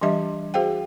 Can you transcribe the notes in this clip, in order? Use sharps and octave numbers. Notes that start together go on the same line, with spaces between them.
E3 G3 D4 G4 D#5 E5
F#4 G#4 C5 F5 G5